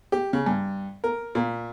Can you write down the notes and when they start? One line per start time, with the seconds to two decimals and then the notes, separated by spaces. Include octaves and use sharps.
0.12 G4
0.33 C#3
0.46 G2
1.04 A#4
1.35 A#2